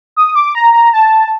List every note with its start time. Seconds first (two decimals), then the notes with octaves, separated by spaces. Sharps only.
0.16 D#6
0.35 D6
0.55 A#5
0.74 A#5
0.94 A5